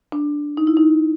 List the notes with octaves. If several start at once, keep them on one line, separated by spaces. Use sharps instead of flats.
D4
D#4
E4
D#4